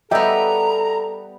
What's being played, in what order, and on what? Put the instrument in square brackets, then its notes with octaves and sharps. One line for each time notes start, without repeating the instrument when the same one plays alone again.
[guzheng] G3 B3 [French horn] A4 [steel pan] D#5 E5 G5 [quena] A#5